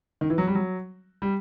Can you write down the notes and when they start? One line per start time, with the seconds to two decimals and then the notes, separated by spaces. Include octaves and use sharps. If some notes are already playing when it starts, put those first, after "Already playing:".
0.21 D#3
0.30 E3
0.38 F#3
0.47 G3
0.55 F#3
1.22 G3